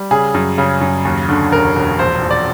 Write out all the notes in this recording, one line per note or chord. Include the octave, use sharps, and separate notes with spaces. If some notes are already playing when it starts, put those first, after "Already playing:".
Already playing: G3
C#3 G#4
F#2
C#3
F#2
D#2
D3
E1 A#4
E1
A#1 C5
A#1
D5